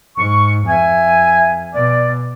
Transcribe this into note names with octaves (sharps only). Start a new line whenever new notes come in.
G#2 C#6
F2 E5 G#5
B2 D5